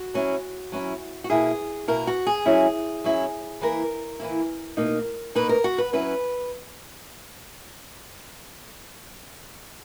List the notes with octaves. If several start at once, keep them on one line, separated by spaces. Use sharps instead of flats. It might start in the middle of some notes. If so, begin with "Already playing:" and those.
Already playing: F#4
F#3 C#4 E4
F#3 C#4 E4
F#4
B2 A#3 E4 G#4
B2 A#3 E4 A#4
F#4
G#4
F#3 C#4 E4
F#3 C#4 E4
E3 A#3 E4 A#4
E3 A#3 E4
B2 A#3 D#4
B2 A#3 D#4 B4
A#4
F#4
B4
F#3 C#4 E4 B4